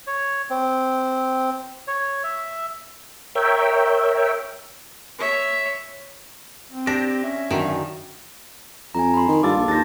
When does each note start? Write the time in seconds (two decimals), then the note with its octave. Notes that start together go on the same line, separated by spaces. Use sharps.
0.07 C#5
0.50 C4
1.88 C#5
2.24 E5
3.35 A#4 C#5 E5 G5
5.18 C#5 E5
6.71 C4
6.87 D4 G4 A#6
7.24 C#4 E5
7.51 F#2 D3 D#3
8.95 F2 G#5 A#5
9.14 B5 C6
9.28 D#3
9.43 G2 F4 A4 A5 D6
9.57 A#1
9.68 D#2 D4 C5 A6 A#6